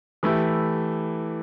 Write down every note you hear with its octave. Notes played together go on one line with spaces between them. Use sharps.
E3 A3 E4 G4